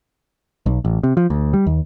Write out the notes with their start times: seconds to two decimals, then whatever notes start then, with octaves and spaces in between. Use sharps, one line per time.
0.66 B1
0.85 A1
1.03 C3
1.17 F3
1.30 D2
1.53 G3
1.66 D#2